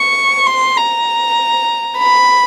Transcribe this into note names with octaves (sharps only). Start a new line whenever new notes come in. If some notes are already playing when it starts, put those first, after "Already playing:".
Already playing: C#6
C6
A#5
B5